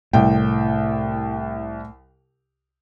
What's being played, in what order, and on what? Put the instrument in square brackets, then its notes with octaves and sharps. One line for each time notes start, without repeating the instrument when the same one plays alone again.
[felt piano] C2 G5 [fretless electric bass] A2